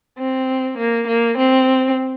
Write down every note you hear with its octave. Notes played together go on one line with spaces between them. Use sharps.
C4
A#3
A#3
C4